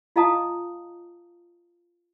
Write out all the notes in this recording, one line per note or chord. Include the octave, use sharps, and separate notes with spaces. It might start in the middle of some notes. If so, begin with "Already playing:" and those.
F4 D#5 F5 A5 A#5 D#6